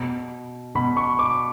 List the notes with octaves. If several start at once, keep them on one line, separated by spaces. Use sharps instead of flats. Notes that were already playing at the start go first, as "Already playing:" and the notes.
Already playing: B2
B2 B5
C#6
D6